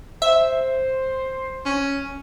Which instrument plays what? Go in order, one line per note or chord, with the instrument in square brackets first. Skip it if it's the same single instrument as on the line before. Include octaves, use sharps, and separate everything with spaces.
[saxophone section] C5 [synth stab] E5
[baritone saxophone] C#4